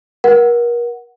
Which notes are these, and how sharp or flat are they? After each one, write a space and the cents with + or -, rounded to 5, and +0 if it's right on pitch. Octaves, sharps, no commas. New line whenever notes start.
A#4 +35 F#5 +0